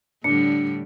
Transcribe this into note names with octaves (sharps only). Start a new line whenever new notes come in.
A2 D3 G3 D4 C#7